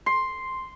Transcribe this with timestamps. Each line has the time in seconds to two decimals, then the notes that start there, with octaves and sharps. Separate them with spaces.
0.06 C6